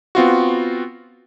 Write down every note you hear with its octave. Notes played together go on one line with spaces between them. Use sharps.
B3 C4 F4 F#4